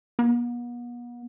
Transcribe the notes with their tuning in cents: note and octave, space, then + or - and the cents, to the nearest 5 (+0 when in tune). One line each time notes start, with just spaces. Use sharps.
B3 -40